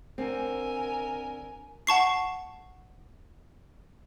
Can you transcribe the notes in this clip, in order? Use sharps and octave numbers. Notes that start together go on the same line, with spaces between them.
D3 C4 A#4 G#5
F#5 A5 C#6 C7